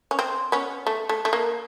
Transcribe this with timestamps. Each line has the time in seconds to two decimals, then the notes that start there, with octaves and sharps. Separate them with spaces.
0.11 C#4
0.19 C4
0.52 B3 C#4
0.87 A3
1.09 A3
1.25 A3
1.33 A#3